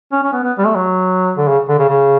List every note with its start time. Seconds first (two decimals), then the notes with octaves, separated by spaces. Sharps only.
0.12 C#4
0.23 C#4
0.33 B3
0.43 B3
0.58 G3
0.65 A3
0.75 F#3
1.38 D3
1.48 C#3
1.69 D3
1.79 C#3
1.89 C#3